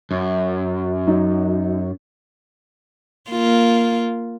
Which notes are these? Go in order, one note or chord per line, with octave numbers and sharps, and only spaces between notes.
F#2
F#3 D#4
A#3 F4